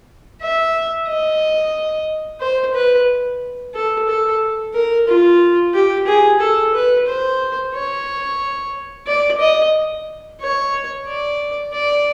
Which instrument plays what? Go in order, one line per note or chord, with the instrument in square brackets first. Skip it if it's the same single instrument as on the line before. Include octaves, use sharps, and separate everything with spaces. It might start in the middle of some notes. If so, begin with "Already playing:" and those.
[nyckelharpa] E5
D#5
C5
B4
A4
A4
A#4
F4
G4
G#4
A4
B4
C5
C#5
D5
D#5
C#5
D5
D5